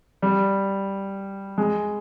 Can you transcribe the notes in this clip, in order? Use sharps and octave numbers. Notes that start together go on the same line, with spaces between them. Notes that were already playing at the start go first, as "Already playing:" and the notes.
G3
G#3